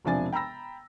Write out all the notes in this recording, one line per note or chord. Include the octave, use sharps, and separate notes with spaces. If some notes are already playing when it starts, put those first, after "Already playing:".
E1 C3 F3 D4 G#5 A6
G5 A#5 B5 E6 A#6